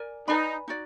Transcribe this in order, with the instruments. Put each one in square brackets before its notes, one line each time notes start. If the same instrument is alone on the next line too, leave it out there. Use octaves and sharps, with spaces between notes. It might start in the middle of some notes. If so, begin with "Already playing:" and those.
Already playing: [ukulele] A#4 D5 G#5
[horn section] D#4 [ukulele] B4 D5 G#5 B5
[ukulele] D#4 F#4 D5